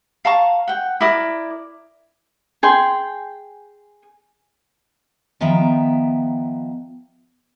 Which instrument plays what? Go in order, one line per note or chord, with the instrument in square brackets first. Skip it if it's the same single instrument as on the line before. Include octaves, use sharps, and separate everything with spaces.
[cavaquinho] F5 A5 A#5 C#6
F#5 G5
E4 A#4 D5 D#6
G#4 G5 C6
[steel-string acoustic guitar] D#3 F3 B3 E5 G5 A#5